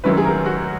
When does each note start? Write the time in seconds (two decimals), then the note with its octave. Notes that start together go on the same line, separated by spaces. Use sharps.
0.04 F#2 D#3 F#3 C#4 E4 B4
0.17 G#4
0.25 A#4
0.46 F#4